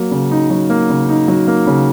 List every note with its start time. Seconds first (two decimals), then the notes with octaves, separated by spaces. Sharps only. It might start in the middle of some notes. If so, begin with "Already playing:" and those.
Already playing: F#3 A#3
0.11 C#3
0.31 D#4
0.50 F#3
0.70 A#3
0.89 C#3
1.09 D#4
1.28 F#3
1.48 A#3
1.67 C#3